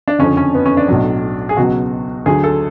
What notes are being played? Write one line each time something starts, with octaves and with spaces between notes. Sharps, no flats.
D4
F#1 F2 D3 F3 C#4
C#4
B3
C#4
D4
B1 A2 F#3
G#4
C#2 B2 F#3 F#4
D2 D3 F#3 G#4
A4